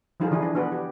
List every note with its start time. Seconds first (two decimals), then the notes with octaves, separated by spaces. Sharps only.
0.20 F3 G3 D#4 F4 G#4 A4
0.31 D3 E3 D4 E4 G#4
0.42 D4
0.55 B3 D4 F#4 B4
0.72 G4